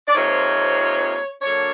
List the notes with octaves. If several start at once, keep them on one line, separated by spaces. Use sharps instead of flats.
D5
F2 C3 F3 A#3 D#4 C#5
D3 F#3 A#3 D4 C#5